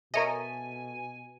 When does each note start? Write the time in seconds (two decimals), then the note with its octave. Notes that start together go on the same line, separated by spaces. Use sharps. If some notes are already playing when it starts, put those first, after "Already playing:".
0.14 B2 A4 A#4 C#5 D#5 E5 G#5